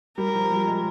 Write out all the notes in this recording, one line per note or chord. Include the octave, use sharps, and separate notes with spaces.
G3 A#4
F3
G3
G#3